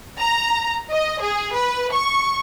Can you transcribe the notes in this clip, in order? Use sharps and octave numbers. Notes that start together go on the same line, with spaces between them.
A#5
D#5
G#4
B4
C#6